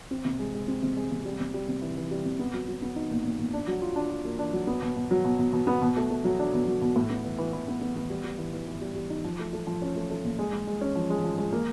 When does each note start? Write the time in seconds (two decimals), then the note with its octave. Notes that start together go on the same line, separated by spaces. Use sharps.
0.11 C4
0.25 C3
0.39 G#3
0.54 G#3
0.68 C4
0.82 C3
0.96 G#3
1.11 C3
1.25 G3
1.40 C3
1.54 G3
1.68 C3
1.82 E3
1.97 E3
2.11 G3
2.25 C3
2.39 B3
2.53 F#3
2.68 F#3
2.82 B3
2.96 D#4
3.11 A#2
3.25 A#2
3.39 A#2
3.53 D4
3.67 F#3
3.82 F4
3.96 D4
4.10 F4
4.25 A#3
4.39 D4
4.53 F#3
4.67 B3
4.82 B2
4.96 B2
5.11 F#3
5.24 B2
5.39 B2
5.53 B2
5.67 B3
5.82 B2
5.97 A3
6.10 A3
6.24 F#3
6.39 D4
6.54 B2
6.67 F#3
6.81 B2
6.96 A2
7.10 B3
7.24 E3
7.38 E3
7.53 E3
7.68 B3
7.81 B3
7.96 B3
8.10 G3
8.24 G3
8.38 E3
8.53 E3
8.67 E3
8.81 G3
8.95 G3
9.10 D#4
9.24 F3
9.39 A3
9.53 A3
9.67 F3
9.82 C#4
9.96 A3
10.10 A3
10.24 A#2
10.39 G#3
10.52 G#3
10.67 G#3
10.81 C#4
10.95 F3
11.10 G#3
11.24 F3
11.38 G#3
11.52 A#3